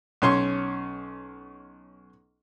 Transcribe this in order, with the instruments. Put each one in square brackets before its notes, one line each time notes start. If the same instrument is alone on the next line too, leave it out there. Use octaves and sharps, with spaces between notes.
[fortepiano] B1 C#4 C6 C#6